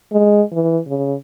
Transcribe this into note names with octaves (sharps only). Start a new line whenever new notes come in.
G#3
E3
C#3